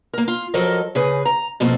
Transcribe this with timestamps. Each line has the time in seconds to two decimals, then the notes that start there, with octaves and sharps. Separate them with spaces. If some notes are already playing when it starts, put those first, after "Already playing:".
0.13 A#3 A#4
0.28 F4
0.54 F3 F#3 A4 A#4 D#5
0.95 C#3 G#4 B4
1.25 A#5
1.60 B2 F3 A#3 C4 A4